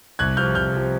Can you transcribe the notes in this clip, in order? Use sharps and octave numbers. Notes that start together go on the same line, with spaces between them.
C2 F#6 G#6
C3 F3 F6 G6
C2 F6 G6
C3 F3